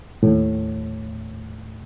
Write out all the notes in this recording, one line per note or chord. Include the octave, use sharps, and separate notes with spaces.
D#2 A2